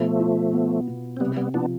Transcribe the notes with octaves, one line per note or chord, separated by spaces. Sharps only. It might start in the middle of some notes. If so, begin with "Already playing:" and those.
Already playing: B2 F3 A3
F4
B3
B2
C4
C3 G3 B3
G3 B3
F3 B3 D4